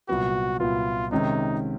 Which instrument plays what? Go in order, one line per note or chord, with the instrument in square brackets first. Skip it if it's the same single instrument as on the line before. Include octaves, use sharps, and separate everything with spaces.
[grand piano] C2 A#2 F#3 B3 [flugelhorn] F#4
[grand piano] C2 A#2 F#3 B3 [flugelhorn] F4
[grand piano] C3 D#3 G#3 C#4 [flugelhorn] D#4